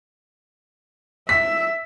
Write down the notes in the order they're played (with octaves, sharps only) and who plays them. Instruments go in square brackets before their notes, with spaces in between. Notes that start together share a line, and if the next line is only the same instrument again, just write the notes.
[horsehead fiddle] E5 [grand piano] B6